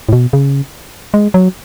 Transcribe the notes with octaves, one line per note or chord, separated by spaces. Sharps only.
A2
B2
C#3
G#3
F#3